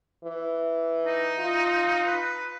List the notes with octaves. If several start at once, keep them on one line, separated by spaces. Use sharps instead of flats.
E3
D#4
F4
B4